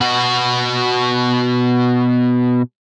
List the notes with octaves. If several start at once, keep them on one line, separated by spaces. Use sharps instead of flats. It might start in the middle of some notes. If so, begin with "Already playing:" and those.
B2 F#4